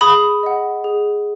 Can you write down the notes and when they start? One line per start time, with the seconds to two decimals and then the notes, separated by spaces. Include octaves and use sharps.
0.01 G#4 B5 D#6
0.43 D#5 F#5
0.84 G#4